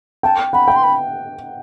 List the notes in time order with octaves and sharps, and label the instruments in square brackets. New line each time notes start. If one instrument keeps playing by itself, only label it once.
[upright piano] G5 [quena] A5
[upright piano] F#5 [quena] B5
[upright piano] G5
[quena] C6
B5